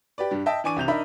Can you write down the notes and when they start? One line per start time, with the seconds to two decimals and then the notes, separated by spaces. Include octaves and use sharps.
0.18 G4 B4 D5
0.31 G2 G3
0.46 D#5 E5 G5 A5
0.64 E3 D4 G#5 C#6 D6 D#7
0.76 C2 C3 G6 F7
0.88 D4 D#4 A#4 E5 B5